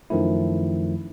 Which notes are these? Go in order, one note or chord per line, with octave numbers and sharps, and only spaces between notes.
F#2 D#3 F3 A3 E4